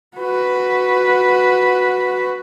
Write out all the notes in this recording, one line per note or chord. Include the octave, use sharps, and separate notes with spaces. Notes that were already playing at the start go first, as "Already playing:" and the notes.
F#4 B4